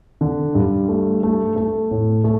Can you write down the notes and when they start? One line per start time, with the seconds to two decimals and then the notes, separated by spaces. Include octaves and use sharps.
0.21 D3
0.55 G2
0.89 A3
1.23 A3
1.56 A3
1.91 A2
2.24 A3